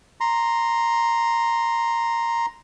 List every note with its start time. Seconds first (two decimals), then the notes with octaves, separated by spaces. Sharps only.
0.21 A#5 C6